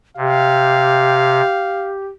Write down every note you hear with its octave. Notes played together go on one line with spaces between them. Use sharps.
C3 G4 F5